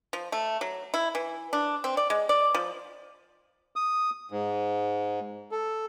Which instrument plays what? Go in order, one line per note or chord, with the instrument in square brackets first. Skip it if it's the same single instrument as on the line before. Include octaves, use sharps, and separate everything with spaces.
[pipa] F3
A3
F#3
E4
E3
D4
C4
D5
G#3
D5
F3
[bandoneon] D#6
G#2
A4